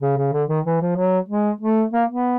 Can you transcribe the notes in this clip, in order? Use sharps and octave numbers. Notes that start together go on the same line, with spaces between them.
C#3
C#3
D3
D#3
E3
F3
F#3
G#3
A3
A#3
B3